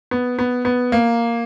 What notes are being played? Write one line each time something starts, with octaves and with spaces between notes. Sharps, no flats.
B3
B3
B3
A#3